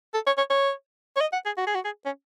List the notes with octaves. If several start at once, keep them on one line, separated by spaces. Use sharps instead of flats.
A4
C#5
C#5
C#5
C#5
D#5
F#5
G#4
F#4
G#4
F#4
G#4
C#4